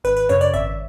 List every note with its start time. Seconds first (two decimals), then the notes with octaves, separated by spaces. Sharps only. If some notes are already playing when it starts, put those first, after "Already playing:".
0.04 G#1 B4
0.17 B4
0.29 F#2 C#3 C#5
0.41 D5
0.54 G#1 E5